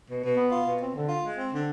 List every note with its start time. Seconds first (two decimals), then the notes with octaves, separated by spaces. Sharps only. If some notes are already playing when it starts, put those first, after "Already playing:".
0.08 B2
0.22 B2
0.36 B3
0.50 F4
0.65 B2
0.79 C4
0.94 D3
1.09 F4
1.22 G#3
1.37 C4
1.51 D3